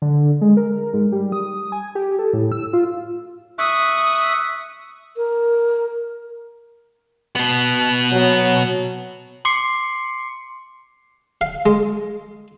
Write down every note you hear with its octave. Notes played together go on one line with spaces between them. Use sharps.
D3
G#3
A#4
G#2
G3
D#6
G#5
G4
A4
A2
E6
F4
E5 C#6 D#6 F#6
A#4
B2 B3
F#3
C6 D6 C7 C#7
F5
G#3